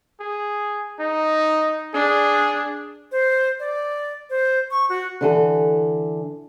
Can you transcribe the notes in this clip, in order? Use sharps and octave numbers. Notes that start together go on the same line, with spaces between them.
G#4
D#4
D4 G#4
C5
D5
C5
C#6
F#4
D3 E3 A4